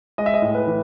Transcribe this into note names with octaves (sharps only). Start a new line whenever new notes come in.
G#3 D#5
E5
D#5
A2
B4
E3